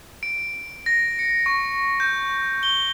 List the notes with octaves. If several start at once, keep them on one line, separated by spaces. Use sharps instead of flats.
D7
A#6
C#7
C#6
G6
G7